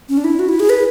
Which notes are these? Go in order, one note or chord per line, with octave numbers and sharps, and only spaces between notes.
C#4
D4
E4
F#4
E4
G#4
B4